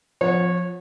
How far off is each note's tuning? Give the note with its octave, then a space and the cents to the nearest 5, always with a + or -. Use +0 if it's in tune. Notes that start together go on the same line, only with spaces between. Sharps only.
F3 +20 C#5 -20 F#5 -15